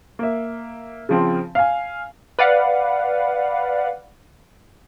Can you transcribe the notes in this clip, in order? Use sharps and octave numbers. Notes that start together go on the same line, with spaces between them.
A#3 E5
C#3 F3 C4
F5 G#5
B4 D5 F5 F#5